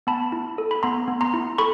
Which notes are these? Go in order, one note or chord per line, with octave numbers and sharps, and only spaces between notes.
B3 A5 B5
E4
A4
B5
B3 A#5 C6
B3
A#5 C6
E4
A4 B5 C#6